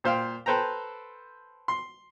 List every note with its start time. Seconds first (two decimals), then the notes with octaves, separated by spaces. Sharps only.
0.04 A#2 C5 F5 G5
0.46 A4 B4 C5 G5 A#5
1.68 C6